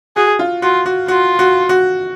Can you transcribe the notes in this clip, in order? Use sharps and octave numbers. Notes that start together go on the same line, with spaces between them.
F#4 G#4
F4
F4 F#4
F#4
F4 F#4
F#4
F#4